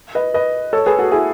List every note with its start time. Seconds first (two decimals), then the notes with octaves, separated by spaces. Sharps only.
0.15 B4 D#5
0.34 B4 D#5
0.73 A4 C#5
0.86 G#4 B4
0.99 F#4 A4
1.11 E4 G#4